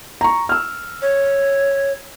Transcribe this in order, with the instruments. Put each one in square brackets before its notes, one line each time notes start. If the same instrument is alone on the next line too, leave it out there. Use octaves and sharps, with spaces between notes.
[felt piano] A#5 C#6
E6 F6
[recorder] C#5